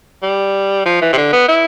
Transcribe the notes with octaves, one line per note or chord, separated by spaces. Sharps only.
G3
F3
E3
C3
D3
B3
E4